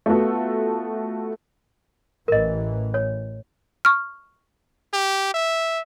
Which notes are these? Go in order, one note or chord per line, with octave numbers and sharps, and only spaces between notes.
A3 B3 F4 F#4 A4
A1 E3 A#4 D#5
C#5
C#6 F6
G4
E5